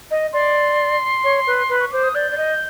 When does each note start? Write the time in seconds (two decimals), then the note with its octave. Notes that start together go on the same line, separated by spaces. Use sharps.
0.11 D#5
0.33 D5 C6
1.24 C#5
1.47 B4
1.69 B4
1.80 C#6
1.91 C5 D6
2.03 D#6
2.14 D5 G6
2.31 D5
2.37 D#5